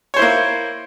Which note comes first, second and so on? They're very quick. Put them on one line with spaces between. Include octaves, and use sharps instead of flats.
C#5 C5 E4 A#3